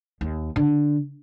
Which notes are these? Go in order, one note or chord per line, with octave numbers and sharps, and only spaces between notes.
D#2
D3